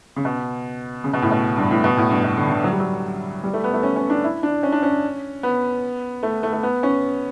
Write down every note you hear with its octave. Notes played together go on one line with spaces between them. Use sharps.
C#3
B2
C#3
B2
A2
B2
G2
A2
B2
A2
G2
B2
D3
D3
F#3
G3
F#3
G3
A3
B3
A3
C#4
C#4
D4
E4
D4
C#4
D4
C#4
B3
A3
A3
A3
B3
C#4